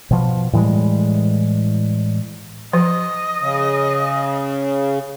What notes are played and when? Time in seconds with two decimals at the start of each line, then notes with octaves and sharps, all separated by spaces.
0.11 B2 F3
0.53 A2 E3 G3 G#3
2.73 F3 D#5
3.42 C#3